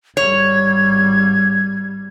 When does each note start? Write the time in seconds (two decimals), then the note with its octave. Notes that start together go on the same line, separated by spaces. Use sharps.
0.17 G#1 G3 C#5 G#6